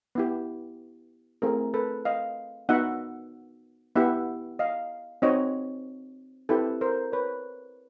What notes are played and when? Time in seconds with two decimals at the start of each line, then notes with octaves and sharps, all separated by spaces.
0.15 B3 E4 G4
1.42 A3 C4 E4 G#4 A#4
1.74 A4 B4
2.05 D#5 F5
2.69 B3 D#4 F#4 E5 F#5
3.96 B3 E4 G4 E5 F#5
4.59 D#5 F5
5.22 C4 D#4 F#4 C#5 D#5
6.49 C4 E4 G4 A4 B4
6.81 A#4 C5
7.12 B4 C#5